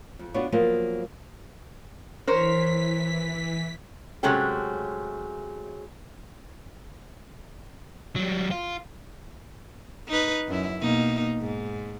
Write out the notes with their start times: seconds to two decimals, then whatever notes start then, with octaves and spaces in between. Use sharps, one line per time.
0.19 F2
0.34 B3 D4 F4 F#4 B4 C#5
0.52 F3 F#3 A#3 B3 F4
2.27 E3 A#4 C5 C#5 B6
4.23 C3 F#3 G#3 A3 C#4 G4
8.16 F#3 G3
8.51 F4
10.08 D#4 B4
10.48 F#2 E4
10.81 B2 A#3 D#4
11.41 G#2